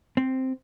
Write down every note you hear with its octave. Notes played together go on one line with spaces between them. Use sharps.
C4